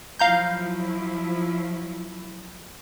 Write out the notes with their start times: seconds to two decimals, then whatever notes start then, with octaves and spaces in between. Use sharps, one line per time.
0.19 F3 F#3 E4 F5 A#5 G6